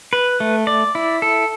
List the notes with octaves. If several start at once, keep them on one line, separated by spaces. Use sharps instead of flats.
B4
A3
D5
E4
A4